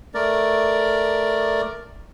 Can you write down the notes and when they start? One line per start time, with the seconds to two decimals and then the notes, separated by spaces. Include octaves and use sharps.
0.14 A3 A#4 D5